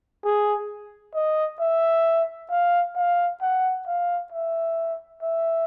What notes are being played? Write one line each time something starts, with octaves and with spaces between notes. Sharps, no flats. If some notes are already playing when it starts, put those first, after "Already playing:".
G#4
D#5
E5
F5
F5
F#5
F5
E5
E5